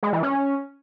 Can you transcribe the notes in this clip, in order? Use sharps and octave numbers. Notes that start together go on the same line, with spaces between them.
G#3
E3
C#4